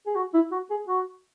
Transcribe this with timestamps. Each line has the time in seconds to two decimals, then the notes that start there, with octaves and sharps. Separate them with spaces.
0.06 G#4
0.16 F#4
0.34 E4
0.52 F#4
0.70 G#4
0.88 F#4